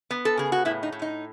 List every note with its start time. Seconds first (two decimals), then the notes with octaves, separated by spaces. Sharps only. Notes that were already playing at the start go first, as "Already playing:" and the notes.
0.10 B3
0.25 A4
0.37 C#3 G#4
0.52 F#4
0.65 A2 E4
0.83 D#4
0.92 A2
1.02 D#4